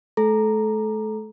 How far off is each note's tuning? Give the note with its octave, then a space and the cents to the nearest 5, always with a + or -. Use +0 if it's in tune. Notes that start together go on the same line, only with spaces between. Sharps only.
A3 -40 A4 -20 A#5 +0